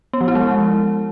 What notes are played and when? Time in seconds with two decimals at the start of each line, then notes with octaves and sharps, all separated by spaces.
0.13 B3
0.21 F3
0.28 E4
0.35 G#3